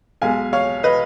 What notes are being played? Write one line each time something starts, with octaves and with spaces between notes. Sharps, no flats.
B1 B2 G#3 F5 G#5
C#5 F5
B4 D#5